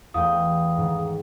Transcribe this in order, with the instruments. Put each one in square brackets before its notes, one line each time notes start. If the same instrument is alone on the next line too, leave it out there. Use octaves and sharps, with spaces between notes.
[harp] E2 A3 G5 [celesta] F5 D#6
[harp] G#2 D#3